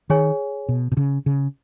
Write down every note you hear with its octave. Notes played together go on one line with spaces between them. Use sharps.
D#3 G#4 C#5 G#5
B2
B2
C#3
C#3